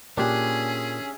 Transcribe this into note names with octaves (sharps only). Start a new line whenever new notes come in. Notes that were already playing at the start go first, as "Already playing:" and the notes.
A#2 C#4 D4 G4 G#4 E5